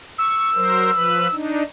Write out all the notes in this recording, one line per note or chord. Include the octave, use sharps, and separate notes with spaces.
C#6 E6
F#3 A#4 C5
F3 B4 B5
D4 D#4